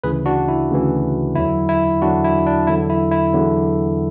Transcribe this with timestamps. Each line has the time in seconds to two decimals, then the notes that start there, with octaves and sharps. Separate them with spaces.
0.04 D2 C#3 E3 G#4 B4
0.26 D4 F#4
0.48 E4
0.70 D2 C#3 E3
1.35 E2 D3 F#3 E4
1.69 E4
2.02 E2 D3 F#3 D4 F#4
2.24 E4
2.46 D4
2.67 E2 D3 F#3 E4
2.90 E4
3.12 E4
3.33 E2 D3 F#3